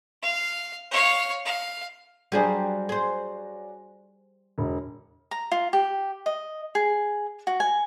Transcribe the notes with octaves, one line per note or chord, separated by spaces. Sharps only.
F5
C#5 F5
F5
F#3 G3 D4 F#4 G#4 C5
G#4 C5
E1
A#5
F4
G4
D#5
G#4
F#4
G#5